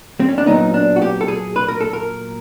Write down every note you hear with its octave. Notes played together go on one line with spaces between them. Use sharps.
C4
C#4
D4
A#2 F#3 B3 D#4
D4
F#4
G4
A4
G#4
B4
A#4
A4
A#4